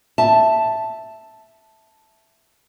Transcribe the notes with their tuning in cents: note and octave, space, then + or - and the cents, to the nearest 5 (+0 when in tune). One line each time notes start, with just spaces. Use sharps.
E5 +0 A5 +0